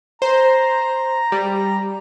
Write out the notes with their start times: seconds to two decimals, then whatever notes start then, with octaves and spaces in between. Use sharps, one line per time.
0.22 C5 A#5
1.32 G3